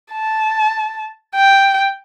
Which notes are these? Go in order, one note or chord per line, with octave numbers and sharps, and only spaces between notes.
A5
G5